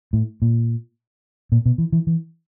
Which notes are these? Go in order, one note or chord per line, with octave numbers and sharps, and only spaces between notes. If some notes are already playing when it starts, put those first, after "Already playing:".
A2
A#2
A#2
B2
E3
E3
E3